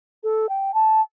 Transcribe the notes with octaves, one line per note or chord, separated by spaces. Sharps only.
A4
G5
A5